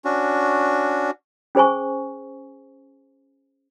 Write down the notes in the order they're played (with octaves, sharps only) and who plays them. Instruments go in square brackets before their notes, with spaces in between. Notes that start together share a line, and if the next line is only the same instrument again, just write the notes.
[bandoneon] C#4 D4 F#4
[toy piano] C#4 G#4 C5 G#5 C#6